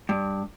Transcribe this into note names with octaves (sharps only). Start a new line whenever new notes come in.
G2